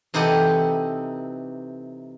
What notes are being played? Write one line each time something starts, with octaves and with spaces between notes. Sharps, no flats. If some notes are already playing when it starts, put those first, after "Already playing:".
C3 E3 D#4 G4 A4 F#5